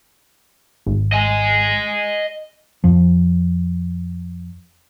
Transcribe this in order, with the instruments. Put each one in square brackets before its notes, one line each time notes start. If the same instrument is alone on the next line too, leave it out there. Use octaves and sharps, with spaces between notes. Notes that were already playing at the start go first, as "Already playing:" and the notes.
[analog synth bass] G#1
[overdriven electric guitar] D#5 G#5
[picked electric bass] F2 F3